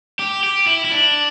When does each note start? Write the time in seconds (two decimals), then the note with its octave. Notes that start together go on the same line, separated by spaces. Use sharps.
0.19 G4
0.44 G4
0.67 E4
0.85 E4
0.91 D4